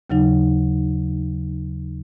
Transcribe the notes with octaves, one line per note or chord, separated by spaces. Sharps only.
D#2 C#3 F#3 D#4